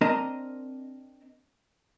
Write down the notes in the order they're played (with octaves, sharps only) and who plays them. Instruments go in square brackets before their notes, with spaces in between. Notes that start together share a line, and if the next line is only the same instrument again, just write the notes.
[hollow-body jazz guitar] C4 D4 A#4 D#5 A#5